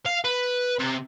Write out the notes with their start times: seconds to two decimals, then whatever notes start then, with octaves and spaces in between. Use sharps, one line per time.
0.06 F5
0.24 B4
0.79 C3